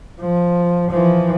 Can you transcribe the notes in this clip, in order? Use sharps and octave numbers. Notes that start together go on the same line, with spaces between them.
F3
E3 F3